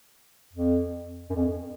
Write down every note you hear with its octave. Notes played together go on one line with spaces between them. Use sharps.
F2
F#2
F2